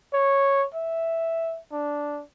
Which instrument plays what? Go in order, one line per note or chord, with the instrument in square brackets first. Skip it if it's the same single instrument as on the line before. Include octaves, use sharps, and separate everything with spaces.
[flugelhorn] C#5
E5
D4